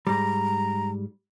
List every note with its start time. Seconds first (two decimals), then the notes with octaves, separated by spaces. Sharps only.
0.07 G#2 G3 A#5